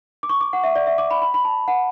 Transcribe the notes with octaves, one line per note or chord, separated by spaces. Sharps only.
D6
C#6
D6
F#5
E5
D5
E5
D6
B5
B5
B5
A5
F#5